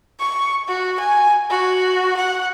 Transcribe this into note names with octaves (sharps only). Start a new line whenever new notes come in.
C#6
F#4
G#5
F#4
F#5